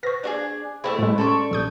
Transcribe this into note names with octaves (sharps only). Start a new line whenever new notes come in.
B4 C5 C#6 F6 A#6
D4 F#4 G#4
A3 C#4 E4 G#4 C5 G5
A2 G#3
C#4 A4 D5 A5 C6 C#6
A#1 D#6 G6